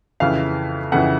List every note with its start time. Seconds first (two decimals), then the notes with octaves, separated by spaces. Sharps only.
0.20 F2 C#3 E3 F5
0.92 F2 C#3 E3 F#5